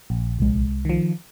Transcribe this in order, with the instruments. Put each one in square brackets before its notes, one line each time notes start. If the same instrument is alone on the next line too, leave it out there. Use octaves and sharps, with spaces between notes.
[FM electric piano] A#1
[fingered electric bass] C2 G#3
[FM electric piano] D#3 F3